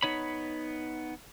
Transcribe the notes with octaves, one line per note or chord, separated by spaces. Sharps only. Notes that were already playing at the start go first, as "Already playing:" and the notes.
B3 D#4 C#5 B5